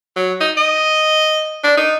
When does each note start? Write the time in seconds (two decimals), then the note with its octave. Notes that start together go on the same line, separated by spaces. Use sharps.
0.16 F#3
0.40 D#4
0.57 D#5
1.64 D4
1.77 D#4